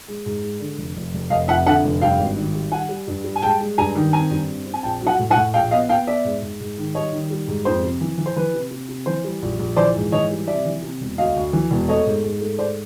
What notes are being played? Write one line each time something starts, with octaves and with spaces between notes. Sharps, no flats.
G#3
G#2
G#3
D3
F1
F1
F1
F1 D#5 F5
F2 E5 F#5
D3 E5 F#5
F1
G2 F5 G5
G#1
D#3
G3
G3 F#5 G#5
G3
G2
G3
G#5
G#3 G5 A5
G#3
G2 G#5 A#5
D#3
C4 G#5 A#5
G2
C4
C4
G#5
A#1 G5 A5
F#3
F#5 G#5
A2
F#5 G#5
A2
A#1 F5 G5
B3 D#5 F5
B3 F5 G5
B3 D5 E5
G#2
G#2
G#2
D#3
G3 C#5 D#5
D#3
G3
G#2
F2 C5
C3
E3
E3
C5
E3 B4
C3
C3
C3
E3 C5
G3
A#1
A#1
E3 C5 D5
G#2
E3 C#5 D#5
G3
C3 D5 E5
E3
C3
E1
D2 D#5 F5
D2
E3
E1
A3 C#5 D#5
G#2
G#2
A3
G#2 C5 D5